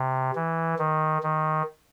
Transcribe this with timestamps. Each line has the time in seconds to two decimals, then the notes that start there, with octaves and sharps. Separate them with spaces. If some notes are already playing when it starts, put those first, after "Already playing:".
Already playing: C3
0.35 E3
0.79 D#3
1.23 D#3